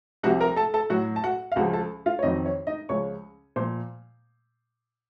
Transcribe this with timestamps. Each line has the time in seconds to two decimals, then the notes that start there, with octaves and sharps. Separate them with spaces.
0.23 C2 C3 F3 F#4 F#5
0.40 A#4 A#5
0.56 A4 A5
0.74 A4 A5
0.90 A2 F#3 F#4 F#5
1.16 A5
1.23 F#4 F#5
1.52 F5
1.56 C#2 C#3 F3 F#4 F#5
1.73 A4 A5
2.06 F4 F5
2.19 C#5
2.23 F2 D#3 F#3 D#4 D#5
2.46 C#5
2.67 D#4 D#5
2.89 C#2 C#3 F3 C#5 C#6
3.56 A#2 F3 C5 C6